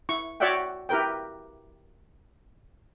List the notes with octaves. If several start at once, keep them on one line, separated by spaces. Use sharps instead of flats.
E4 C#6
F#4 C#5 D5 E5 F#5 G5
E4 G4 A#4 B4 G5